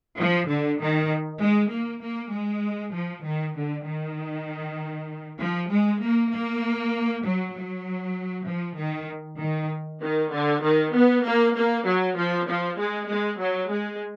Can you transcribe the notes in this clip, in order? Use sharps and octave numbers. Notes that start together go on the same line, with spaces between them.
F3
D3
D#3
G#3
A#3
A#3
G#3
F3
D#3
D3
D#3
F3
G#3
A#3
A#3
F#3
F#3
F3
D#3
D#3
D#3
D3
D#3
B3
A#3
A#3
F#3
F3
F3
G#3
G#3
F#3
G#3